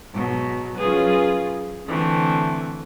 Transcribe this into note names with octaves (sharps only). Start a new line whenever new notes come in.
G#2 B2 F#3
F#3 C#4 F4 G#4 B4
D3 E3 A3 C4